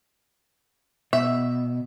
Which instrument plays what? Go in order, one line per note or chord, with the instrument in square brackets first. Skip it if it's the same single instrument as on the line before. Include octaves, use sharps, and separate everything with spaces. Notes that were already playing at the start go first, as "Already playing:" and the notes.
[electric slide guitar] B2 [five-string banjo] E5